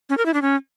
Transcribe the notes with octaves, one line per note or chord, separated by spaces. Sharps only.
C#4
A#4
E4
D4
C#4